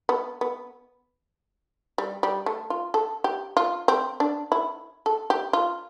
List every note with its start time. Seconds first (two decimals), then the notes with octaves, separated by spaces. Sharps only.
0.09 B3
0.41 B3
1.98 G3
2.23 G3
2.46 A3
2.70 F4
2.94 A4
3.24 G4
3.57 F4
3.88 C4
4.20 D4
4.52 E4
5.06 A4
5.30 G4
5.53 F4